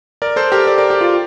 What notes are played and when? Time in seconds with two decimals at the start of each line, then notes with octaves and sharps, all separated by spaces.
0.22 A#4 D5
0.36 A4 C5
0.52 G4 A#4
0.67 A#4 D5
0.78 A#4 D5
0.90 G4
1.01 F4